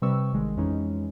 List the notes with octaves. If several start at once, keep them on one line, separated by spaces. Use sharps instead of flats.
C3 G3 C4 B4 C#6 E6
A1 D#3 G#3
F2 E3 G#3 C#4 D#4